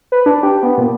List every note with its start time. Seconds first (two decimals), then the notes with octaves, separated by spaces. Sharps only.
0.12 B4
0.26 D4
0.43 G4
0.63 B3
0.78 A#2